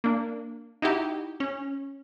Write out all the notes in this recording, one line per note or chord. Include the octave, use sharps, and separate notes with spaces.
A#3 D4
D#4 E4 F#4 G4
C#4